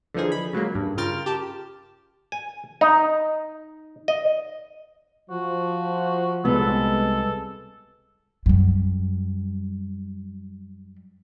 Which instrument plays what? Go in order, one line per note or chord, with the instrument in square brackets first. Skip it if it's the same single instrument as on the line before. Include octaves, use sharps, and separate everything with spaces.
[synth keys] D3 E3 F3 D#4 G#4
B5
C#3 F#3 G#3 A#3
G2
C#3 F4 A#4 G5 F6 A6
G4 A5
[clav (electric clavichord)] G#5
D#4
D#5
[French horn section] F3 [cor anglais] F#4
[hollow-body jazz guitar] C2 B3 [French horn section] G#3 [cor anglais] A4
[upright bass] F#2 G3